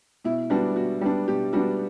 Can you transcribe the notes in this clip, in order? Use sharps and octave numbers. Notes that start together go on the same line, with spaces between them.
B2 E4
G3 B3 D4 F#4
B2 F#4
G3 B3 D4
B2 G4
G3 B3 D4 F#4